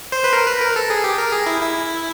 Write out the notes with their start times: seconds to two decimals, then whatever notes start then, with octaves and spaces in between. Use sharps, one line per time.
0.12 C5
0.24 B4
0.33 A#4
0.47 B4
0.61 A#4
0.76 A4
0.90 G#4
1.04 G4
1.18 A#4
1.32 G#4
1.46 E4
1.62 E4